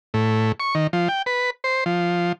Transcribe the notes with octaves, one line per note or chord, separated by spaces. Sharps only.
A2
C#6
D#3
F3
G5
B4
C5
F3